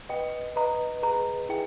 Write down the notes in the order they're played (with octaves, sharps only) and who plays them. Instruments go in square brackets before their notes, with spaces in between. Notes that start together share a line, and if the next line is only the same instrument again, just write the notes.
[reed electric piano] B4 D#5 [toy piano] G5
[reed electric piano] B4 D#5 [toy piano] A#5
[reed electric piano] G#4 B4 [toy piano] A#5
[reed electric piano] E4 G#4 [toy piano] G5